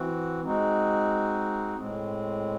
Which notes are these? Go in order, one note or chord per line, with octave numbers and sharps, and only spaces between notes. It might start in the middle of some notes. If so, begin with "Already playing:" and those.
Already playing: E3 C4 F#4
G#3 C4 D#4 F#4
A2 G#3 C4